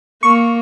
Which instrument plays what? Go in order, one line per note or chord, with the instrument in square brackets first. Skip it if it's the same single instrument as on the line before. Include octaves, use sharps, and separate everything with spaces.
[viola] A#3 [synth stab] C#6